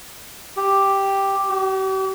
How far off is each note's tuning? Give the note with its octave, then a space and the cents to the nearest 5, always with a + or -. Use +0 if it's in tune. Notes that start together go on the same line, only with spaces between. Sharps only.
G4 +0
G4 -45